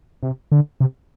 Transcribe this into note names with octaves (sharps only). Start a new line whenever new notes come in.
C3
D3
C3